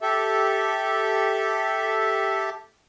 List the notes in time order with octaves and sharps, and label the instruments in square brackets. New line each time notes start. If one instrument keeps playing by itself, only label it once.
[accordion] G4 A4 E5